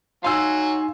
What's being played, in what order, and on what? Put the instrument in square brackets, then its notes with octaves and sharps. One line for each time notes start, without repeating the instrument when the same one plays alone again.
[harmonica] F#3 F#4 [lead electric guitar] D#4 F5 [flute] G#5 [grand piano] C6 E6